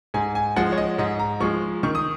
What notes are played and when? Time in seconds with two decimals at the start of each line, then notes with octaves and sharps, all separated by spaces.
0.14 G#2 G#5
0.35 G#5
0.56 F3 G#3 F#5
0.72 C#5
0.78 D#5
0.98 G#2 D#5
1.19 A#5
1.40 F3 G#3 C#6
1.83 D#3 C#6
1.95 D#6